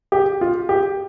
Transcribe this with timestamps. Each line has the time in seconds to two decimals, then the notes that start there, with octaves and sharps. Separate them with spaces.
0.12 G4
0.41 F4
0.69 G4